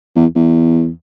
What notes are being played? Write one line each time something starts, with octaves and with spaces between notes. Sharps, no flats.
E2
E2